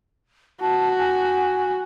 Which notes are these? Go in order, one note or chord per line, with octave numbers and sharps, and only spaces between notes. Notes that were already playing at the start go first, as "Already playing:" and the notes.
F#4 A5
G#5